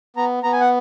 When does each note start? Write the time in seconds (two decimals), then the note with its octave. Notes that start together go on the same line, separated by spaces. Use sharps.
0.17 B3 A#5
0.43 B3 A#5
0.53 G#5
0.61 F#5